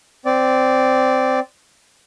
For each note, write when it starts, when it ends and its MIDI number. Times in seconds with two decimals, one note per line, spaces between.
0.25 1.40 60
0.25 1.40 74